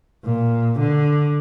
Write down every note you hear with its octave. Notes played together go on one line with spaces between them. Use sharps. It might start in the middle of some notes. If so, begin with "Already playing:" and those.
A#2
D3